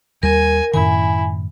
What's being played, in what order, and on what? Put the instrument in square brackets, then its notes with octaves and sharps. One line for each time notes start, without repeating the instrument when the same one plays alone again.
[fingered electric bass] D#2 G3 [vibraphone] A#4 [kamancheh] G#5
[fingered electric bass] F#2 A2 D#3 [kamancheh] E4 [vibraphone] G#5